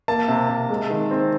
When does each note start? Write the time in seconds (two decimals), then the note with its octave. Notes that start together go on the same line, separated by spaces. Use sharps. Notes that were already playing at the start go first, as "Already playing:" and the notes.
0.08 A#3 A5
0.28 C3
0.49 C3
0.69 G#3
0.90 D#3
1.11 C4